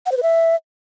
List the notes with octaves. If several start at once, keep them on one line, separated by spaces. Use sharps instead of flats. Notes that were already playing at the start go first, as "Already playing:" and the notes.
F#5
C5
B4
E5